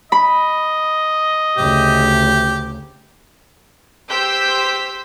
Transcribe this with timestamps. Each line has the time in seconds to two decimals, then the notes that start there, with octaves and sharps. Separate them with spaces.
0.12 D#5 B5
1.57 D2 C#3 G4
4.09 G4 C5 E6 G6 B6